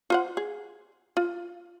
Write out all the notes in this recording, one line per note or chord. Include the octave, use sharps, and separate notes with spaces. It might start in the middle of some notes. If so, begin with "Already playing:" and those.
F4 C5 F#5
G#4
F4